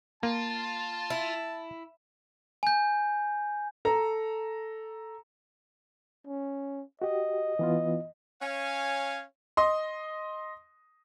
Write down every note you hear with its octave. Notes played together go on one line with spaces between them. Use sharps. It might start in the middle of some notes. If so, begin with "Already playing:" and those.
A#3 F4 A5
E4
G#5 G6
A4 A#5
C#4
F#4 G4 D#5
E3 B3 F4
C#4 C#5 F5 G#5
D#5 C6